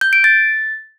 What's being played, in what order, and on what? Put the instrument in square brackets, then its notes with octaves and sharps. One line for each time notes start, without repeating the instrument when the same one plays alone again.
[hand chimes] G6
D7
A6